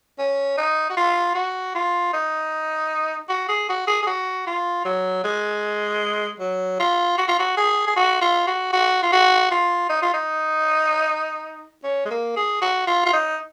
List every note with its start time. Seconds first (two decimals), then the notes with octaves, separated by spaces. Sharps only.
0.19 C#4
0.57 D#4
0.90 F#4
0.97 F4
1.35 F#4
1.75 F4
2.13 D#4
3.29 F#4
3.48 G#4
3.69 F#4
3.87 G#4
4.03 G#4
4.07 F#4
4.47 F4
4.85 F#3
5.24 G#3
6.40 F#3
6.79 F4
7.18 F#4
7.28 F4
7.39 F#4
7.57 G#4
7.87 G#4
7.96 F#4
8.21 F4
8.47 F#4
8.73 F#4
9.03 F4
9.12 F#4
9.51 F4
9.89 D#4
10.02 F4
10.14 D#4
11.84 C#4
12.05 G#3
12.11 A#3
12.36 G#4
12.61 F#4
12.87 F4
13.05 F4
13.13 D#4